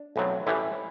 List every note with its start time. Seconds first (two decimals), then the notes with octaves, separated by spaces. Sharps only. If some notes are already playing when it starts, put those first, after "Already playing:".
Already playing: D4
0.16 B1 A2 F#3 C4
0.46 A1 A2 E3 G3 E4